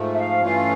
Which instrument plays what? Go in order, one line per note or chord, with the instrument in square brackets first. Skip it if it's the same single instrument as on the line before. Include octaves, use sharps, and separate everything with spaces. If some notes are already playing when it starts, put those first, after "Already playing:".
Already playing: [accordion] G#2 F3 A3
[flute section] E5
F5
[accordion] G2 E3 A3 C#4 F4